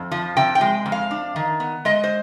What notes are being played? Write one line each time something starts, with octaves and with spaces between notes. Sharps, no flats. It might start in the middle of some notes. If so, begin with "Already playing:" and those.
Already playing: F2
F3
C3 G5
G5
G#3
F2
F5
D4
D#3
B3
G#3 D#5
C5